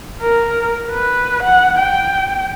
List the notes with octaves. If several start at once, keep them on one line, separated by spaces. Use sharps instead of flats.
A#4
B4
F#5
G5